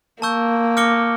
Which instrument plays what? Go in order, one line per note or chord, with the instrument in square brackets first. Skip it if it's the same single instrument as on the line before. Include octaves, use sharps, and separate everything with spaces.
[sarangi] A#3 [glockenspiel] A5 C#6 E6 G6
[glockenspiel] D6 F6 A#6 C#7 G7